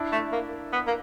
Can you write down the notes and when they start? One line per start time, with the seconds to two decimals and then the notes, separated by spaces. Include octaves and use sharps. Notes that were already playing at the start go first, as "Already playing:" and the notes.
Already playing: D4 E4
0.12 A3
0.32 A#3
0.73 B3
0.87 A#3